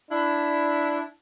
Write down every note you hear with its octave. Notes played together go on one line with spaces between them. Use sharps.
D4 E4